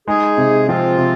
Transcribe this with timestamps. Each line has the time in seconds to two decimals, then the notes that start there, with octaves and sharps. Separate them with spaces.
0.08 G#3 D#4 G#4
0.37 C3
0.68 F3 C4 F4
0.98 C3